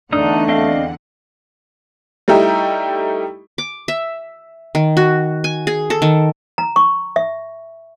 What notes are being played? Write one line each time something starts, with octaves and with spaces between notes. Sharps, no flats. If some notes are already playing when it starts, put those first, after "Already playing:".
E2 D3 A3 D4 D#4 F#5 D#6
C4 D#5 F5
G3 A3 D#4 E4 G4
D6
E5
D#3
F#4
G#5
G#4
A4
D#3
A#5
C#6
E5